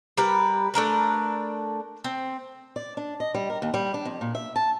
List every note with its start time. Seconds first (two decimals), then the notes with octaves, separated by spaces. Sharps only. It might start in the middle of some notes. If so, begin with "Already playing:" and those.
0.17 G3 A#4 B4
0.74 A3 D4 A#4 B4
2.04 C4
2.76 D5
2.97 D4
3.20 D#5
3.34 G3
3.50 A#4
3.62 D#2
3.74 G3
3.94 D4
4.05 F2
4.21 A#2
4.35 E5
4.56 A5